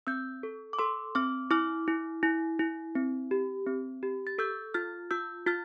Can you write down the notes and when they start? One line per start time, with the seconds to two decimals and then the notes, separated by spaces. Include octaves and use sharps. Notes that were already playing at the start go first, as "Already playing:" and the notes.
0.07 C4 E6 G6
0.43 A4
0.73 D6
0.79 A4 C6 E6
1.15 C4 D6 F6
1.51 E4 D6 F6
1.88 E4
2.23 E4
2.59 E4
2.95 C4
3.31 G4
3.67 C4
4.03 G4
4.27 A6
4.38 A4 E6 G6
4.74 F4 F6 A6
5.11 F4 E6 G6
5.46 F4 F6 A6